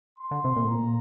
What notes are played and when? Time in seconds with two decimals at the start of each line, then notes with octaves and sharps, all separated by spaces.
0.19 C6
0.31 D3
0.44 C3
0.56 A#2
0.64 A2
0.69 A#2 A#5